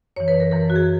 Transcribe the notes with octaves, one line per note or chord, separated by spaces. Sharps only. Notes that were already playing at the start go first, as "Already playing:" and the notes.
F#2 E3 C#5
B4
A#4
F#2 E3 A#4
F#4
G#4